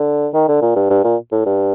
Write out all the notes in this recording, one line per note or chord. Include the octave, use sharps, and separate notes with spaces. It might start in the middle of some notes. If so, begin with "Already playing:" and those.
Already playing: D3
D#3
D3
A#2
G2
G2
A#2
A2
G2